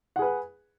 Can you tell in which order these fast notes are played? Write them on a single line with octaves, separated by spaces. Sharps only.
F#5 G#4 B4